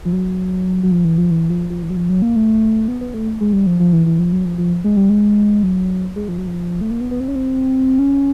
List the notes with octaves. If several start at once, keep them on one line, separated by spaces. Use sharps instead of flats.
F3
F#3
F#3
F3
E3
F3
E3
F3
F3
E3
F#3
F3
F#3
A#3
A3
B3
B3
A3
G#3
G3
F3
F3
E3
E3
F3
F#3
F3
F3
G#3
G3
G#3
F#3
G#3
F3
F#3
F3
A3
A#3
B3
B3
C4
C#4
C4
C#4